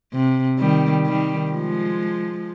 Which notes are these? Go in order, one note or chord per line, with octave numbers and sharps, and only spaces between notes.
C3
D#3 G3
D#3 G3
F3 G#3